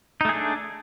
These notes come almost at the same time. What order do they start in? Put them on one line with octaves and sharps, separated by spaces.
D#4 A3 G#4 D4